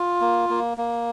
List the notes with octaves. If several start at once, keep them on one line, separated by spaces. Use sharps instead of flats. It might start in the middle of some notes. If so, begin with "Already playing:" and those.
Already playing: F4
A#3
A#3
A#3